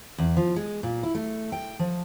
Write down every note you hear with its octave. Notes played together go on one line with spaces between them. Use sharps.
E2
F3
G#3
A#2
E4
A3
G5
F3